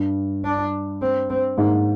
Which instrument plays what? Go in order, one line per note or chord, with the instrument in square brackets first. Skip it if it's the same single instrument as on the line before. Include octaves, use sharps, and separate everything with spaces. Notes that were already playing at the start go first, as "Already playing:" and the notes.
Already playing: [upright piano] G2
[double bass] D4
C4
C4
[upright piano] G#2 [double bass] A#3